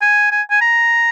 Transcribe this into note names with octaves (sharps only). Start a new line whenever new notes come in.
G#5
G#5
G#5
A#5